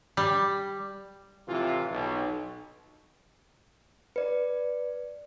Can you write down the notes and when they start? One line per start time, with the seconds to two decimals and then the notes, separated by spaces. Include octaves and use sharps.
0.17 G3
1.48 A2 C3 E3 F3 F4
1.92 B1
4.16 B4 D5